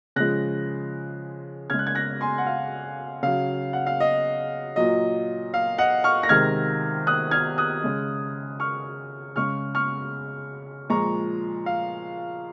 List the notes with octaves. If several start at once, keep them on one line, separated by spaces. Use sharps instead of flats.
C#3 F3 G#3 F#6 A#6
C#3 G#3 F6 G#6
F#6
G#6
F#6 A#6
G#5 C6
F#5
F5
C#3 F#3 F5
F#5
F5
D#5
A#2 F#3 D#5
F5
D#5 F#5
C#6 F6
A#6
C3 D#3 G#3 F6 G#6
D#6 F#6
F6 G#6
D#6 F#6
C#3 G#3
C#6 F6
C#3 G#3 C#6 F6
C#6 F6
A#2 F3 G#3 A#5 C#6
F5